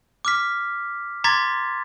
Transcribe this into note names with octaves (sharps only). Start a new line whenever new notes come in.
D6 F6 B6
A#5 C6 D6 G#6 A6 B6